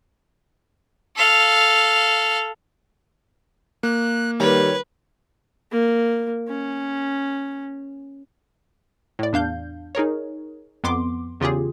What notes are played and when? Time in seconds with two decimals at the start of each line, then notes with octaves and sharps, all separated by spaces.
1.17 A4 F5
3.83 A#3 F#6
4.40 D#3 G3 B4 C#5
5.72 A#3
6.48 C#4
9.19 A2 D5
9.33 E2 D4 F5 G6
9.95 D#4 G#4 A#4 C#5
10.84 F2 B3 C6 D6
11.40 E2 C#3 F4 G4 G#4